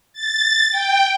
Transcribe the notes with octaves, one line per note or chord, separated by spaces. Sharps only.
A6
G5